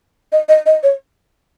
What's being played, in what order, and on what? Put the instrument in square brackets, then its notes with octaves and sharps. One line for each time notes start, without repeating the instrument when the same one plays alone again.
[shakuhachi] D#5
D#5
D#5
C#5